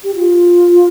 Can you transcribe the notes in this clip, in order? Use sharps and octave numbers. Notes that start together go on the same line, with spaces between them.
G4
F4